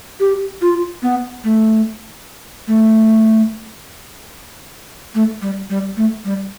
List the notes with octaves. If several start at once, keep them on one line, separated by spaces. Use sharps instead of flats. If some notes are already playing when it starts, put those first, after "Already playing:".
G4
F4
B3
A3
A3
A3
G3
G3
A3
G3